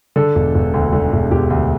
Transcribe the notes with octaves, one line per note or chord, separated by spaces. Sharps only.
D3 A4
E1
E1
D2
D3
E1
E1 G4
D2